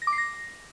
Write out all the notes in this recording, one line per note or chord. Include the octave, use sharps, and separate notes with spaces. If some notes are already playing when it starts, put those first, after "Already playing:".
A#6
D6
C7
A#6